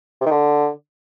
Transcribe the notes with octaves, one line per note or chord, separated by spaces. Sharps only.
C3
D#3
D3